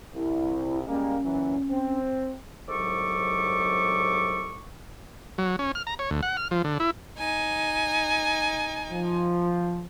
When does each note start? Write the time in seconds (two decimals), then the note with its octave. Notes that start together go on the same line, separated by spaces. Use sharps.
0.14 C2 E4
0.87 G3 G#3 A#3 C#4
1.25 A#2 E3 F#3
1.70 C4
2.68 C2 G#2 F#3 A4 C#6 D6
5.38 F#3
5.59 C#4
5.75 F6
5.87 A#5
5.99 C#5
6.11 D2
6.23 F#5
6.37 F6
6.51 F3
6.64 D3
6.80 E4
7.19 D#4 G#5
8.91 F3